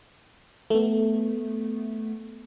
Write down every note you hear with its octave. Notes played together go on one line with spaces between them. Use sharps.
A3 B3